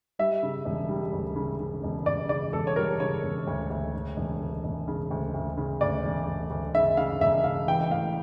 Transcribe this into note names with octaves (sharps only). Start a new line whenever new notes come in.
G3 E5
C#3
E1
G3
D2
C#3
C#3
E1
E1 D5
C#3 D5
E1 A4
C#5
G3 A#4
C#3 C#5
E1
D2
D2
C#3
E1
D2
E1
C#3
D2
D2
C#3
D2 D5
E1
D2
D2
C#3 E5
C#3 F5
E1 E5
C#3 F5
E3 G5
A2 F5